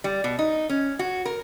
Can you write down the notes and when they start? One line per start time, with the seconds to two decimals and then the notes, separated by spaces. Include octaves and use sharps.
0.04 G3
0.24 B2
0.39 D#4
0.69 C#4
0.99 F#4
1.25 A#4